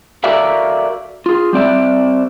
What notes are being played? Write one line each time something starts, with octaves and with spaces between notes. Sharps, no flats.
F#4 A4 A#4 D5 E5 F5
F4 G#4
G3 C4 D5 E5